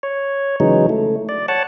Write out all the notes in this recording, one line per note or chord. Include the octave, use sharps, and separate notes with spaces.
C#5
C#3 E3 F#3 G#3 D#4
A3
D5
C#5 F#5 A5